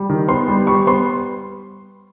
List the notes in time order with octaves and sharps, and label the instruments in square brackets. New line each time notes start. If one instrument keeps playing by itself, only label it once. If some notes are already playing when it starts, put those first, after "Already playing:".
Already playing: [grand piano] G3
D#3
B3 C6
G3
G3 C#6
B3 C6